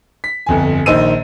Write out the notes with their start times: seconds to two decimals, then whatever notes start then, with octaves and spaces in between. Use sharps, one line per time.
0.24 B6
0.46 G1 F2 G#5
0.86 A#1 D#3 C5 D#5 E6 D#7